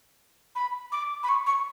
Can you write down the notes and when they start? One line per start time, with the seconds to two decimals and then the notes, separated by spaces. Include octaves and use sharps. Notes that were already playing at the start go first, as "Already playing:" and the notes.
0.55 B5
0.92 D6
1.23 B5
1.29 C#6
1.46 C#6